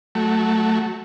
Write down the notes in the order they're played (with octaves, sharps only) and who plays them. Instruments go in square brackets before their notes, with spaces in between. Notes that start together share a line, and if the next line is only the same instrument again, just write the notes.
[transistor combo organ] F#3 A3